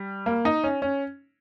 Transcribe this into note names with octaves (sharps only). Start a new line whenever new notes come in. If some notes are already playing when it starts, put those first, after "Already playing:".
Already playing: G3
A#3
D#4
C#4
C#4